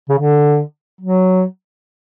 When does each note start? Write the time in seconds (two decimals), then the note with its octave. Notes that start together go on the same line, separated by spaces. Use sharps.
0.09 C#3
0.18 D3
1.01 F#3